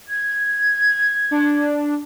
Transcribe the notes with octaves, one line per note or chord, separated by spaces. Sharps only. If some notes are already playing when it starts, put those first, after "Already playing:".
G#6
D4